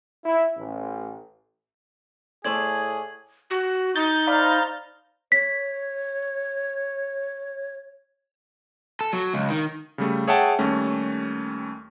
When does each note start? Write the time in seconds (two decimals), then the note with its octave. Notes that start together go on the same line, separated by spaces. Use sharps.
0.24 E4
0.57 A1
2.45 A2 A3 G#4 C5 D5 G#6 F#7
3.50 F#4
3.96 D#4 G6 A6
4.27 C5 D5 F5 A#5 B5 F6
5.32 C#5 B6
9.01 A4
9.13 F#3
9.34 C#2
9.50 D#3
9.98 C#3 G3 A3
10.27 G#4 C#5 E5 F#5 G5 A5
10.59 D#2 G3 A3 C#4